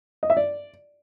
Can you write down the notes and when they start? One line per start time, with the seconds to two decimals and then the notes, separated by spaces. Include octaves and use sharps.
0.23 D#5
0.30 E5
0.37 D5